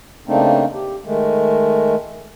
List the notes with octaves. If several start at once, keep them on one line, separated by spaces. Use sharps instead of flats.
C#3 A3 A#3 C4 D4 D#4
G4
D#3 G#3 A3